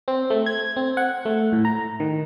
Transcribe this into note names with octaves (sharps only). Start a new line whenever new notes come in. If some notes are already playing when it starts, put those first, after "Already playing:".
C4
A3
G#6
C4
F#5
A3
A2
A#5
D#3